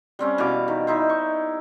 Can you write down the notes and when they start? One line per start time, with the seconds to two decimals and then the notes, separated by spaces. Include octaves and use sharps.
0.19 G3 C4 C#4
0.38 B2 E3 F5 D6
0.68 D#3
0.87 D#4 E4 C5
1.10 C#6